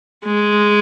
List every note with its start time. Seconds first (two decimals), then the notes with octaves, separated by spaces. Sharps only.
0.25 G#3